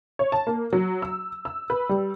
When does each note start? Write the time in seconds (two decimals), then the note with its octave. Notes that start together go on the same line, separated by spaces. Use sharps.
0.19 C#5
0.32 A5
0.47 A#3
0.73 F#3
1.02 E6
1.45 E6
1.70 B4
1.89 G3